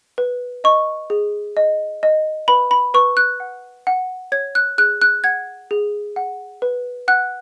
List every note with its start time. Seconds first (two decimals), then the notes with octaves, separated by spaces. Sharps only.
0.18 B4
0.64 D#5 C#6
1.10 G#4
1.57 D#5
2.03 D#5
2.48 B4 B5
2.71 B5
2.94 B4 C#6
3.17 F#6
3.40 F#5
3.87 F#5
4.32 C#5 G#6
4.55 F#6
4.78 G#4 F#6
5.02 F#6
5.24 F#5 G#6
5.71 G#4
6.16 F#5
6.62 B4
7.08 F#5 F#6